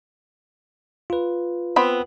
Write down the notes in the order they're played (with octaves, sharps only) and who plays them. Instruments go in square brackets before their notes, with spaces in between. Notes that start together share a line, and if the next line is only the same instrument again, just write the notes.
[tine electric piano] F4 B4
[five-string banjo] B3 C4 B5